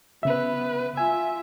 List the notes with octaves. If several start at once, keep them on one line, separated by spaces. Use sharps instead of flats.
C#3 B3 B4 E5
F4 E5 G#5